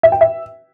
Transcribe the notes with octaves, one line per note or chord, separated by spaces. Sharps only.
E5
G5
E5